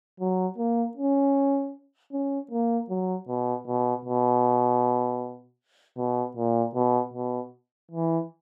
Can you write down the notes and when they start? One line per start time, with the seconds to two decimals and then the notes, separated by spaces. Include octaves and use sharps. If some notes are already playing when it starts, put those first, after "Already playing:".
0.20 F#3
0.58 A#3
0.97 C#4
2.13 C#4
2.51 A#3
2.89 F#3
3.28 B2
3.67 B2
4.05 B2
5.98 B2
6.37 A#2
6.75 B2
7.13 B2
7.91 E3